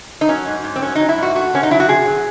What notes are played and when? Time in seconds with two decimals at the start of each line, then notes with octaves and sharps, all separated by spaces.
0.21 D#4
0.29 F#3 C#4
0.47 G#2
0.64 G#2
0.76 C4
0.82 F#3 C#4
0.95 F#3 D#4
1.09 E4
1.18 G#2 F#4
1.35 A3 F#4
1.53 C3 C#4
1.63 D#4
1.70 F#3 E4
1.80 F#4
1.89 C3 G#4
2.05 F#3